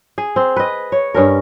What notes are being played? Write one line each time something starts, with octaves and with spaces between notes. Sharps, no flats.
G#4
C4
B4 D#5
C#5
G2 C#4 A#4